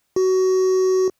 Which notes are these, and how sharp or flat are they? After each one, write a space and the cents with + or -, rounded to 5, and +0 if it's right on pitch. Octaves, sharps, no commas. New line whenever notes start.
F#4 +20